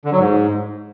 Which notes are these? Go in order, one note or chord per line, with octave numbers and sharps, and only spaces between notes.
D3
F#3
G#2